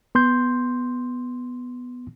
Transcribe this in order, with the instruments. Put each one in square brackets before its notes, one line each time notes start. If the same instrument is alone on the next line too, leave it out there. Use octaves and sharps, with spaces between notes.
[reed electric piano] B3 C6 G6